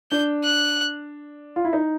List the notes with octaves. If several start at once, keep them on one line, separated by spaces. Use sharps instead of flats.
D4 G6
F#6
F4
E4
D#4